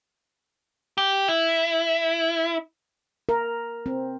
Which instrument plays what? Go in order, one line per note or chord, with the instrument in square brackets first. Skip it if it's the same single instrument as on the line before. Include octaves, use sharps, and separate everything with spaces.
[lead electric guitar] G4
E4
[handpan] A#4
C4